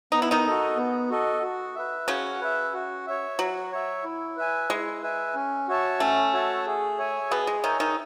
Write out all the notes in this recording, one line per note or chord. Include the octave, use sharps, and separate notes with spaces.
B3 D#4
E4
D#3 D#4
F#4 A4 D#5
B3
F#4 A4 D#5
F#4
B4 E5
C#3 C#4 F#4
B4 E5
F#4
C#5 E5
F#3 F#4
C#5 E5
E4
B4 E5 G#5
G#3 E4
B4 E5 G#5
C#4
F#4 C#5 E5 A5
A3 C#4
F#4 C#5 E5 A5
G#4
C#5 E5 G#5
B2 B3 G#4
G#3
D#3 D#4 C#5 E5 G#5
D#3 D#4